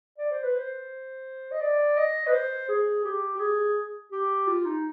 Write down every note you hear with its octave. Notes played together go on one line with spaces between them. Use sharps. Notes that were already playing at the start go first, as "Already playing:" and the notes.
D5
C5
B4
C5
D#5
D5
D#5
B4
C5
G#4
G4
G4
G#4
G4
F4
D#4